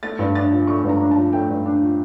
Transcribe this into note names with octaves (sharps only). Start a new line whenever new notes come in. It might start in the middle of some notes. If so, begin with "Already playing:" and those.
A3 A6
G2
D4 A6
F3
A3 C#6
G2
A#5
D4
A5
F3
A3 G5
G2
D4
F3